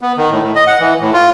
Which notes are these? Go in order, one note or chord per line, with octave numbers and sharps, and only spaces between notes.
B3
D#3
A2
A2
D#5
F#5
E3
A2
F4